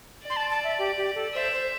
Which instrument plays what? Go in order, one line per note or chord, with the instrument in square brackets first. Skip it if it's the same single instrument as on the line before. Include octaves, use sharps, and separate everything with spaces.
[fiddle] D5
[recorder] C6
A5
A5
E5
G4
G4
A4
[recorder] C5 [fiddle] E5
[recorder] C5